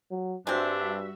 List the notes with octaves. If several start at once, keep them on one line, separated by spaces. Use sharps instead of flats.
F#3
G2 G3 G#3 C4 D4 F#4 E5